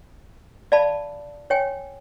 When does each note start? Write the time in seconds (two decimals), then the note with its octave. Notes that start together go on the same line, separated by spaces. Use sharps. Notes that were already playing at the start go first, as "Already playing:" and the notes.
0.72 D5 F5 A5 B5
1.50 C#5 G5 G#5